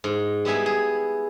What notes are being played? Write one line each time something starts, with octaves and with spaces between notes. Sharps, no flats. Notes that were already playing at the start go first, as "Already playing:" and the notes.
G#2
G3 B3 E4 G#4 E5
G#4